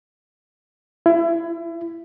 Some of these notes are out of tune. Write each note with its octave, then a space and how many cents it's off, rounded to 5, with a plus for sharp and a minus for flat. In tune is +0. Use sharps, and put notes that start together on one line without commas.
E4 +30